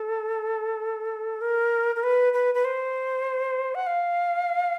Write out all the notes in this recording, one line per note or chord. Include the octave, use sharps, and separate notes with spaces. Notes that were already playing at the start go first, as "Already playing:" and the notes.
Already playing: A4
A#4
A#4
B4
B4
B4
C5
F#5
F5